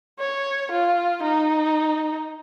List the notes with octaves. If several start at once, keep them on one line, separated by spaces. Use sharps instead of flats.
C#5
F4
D#4